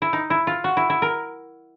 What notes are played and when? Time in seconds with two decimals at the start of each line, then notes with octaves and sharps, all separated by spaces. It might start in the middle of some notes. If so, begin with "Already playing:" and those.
0.02 E4
0.13 D#4
0.30 E4
0.47 F4
0.64 F#4
0.77 E4
0.90 E4
1.02 A#4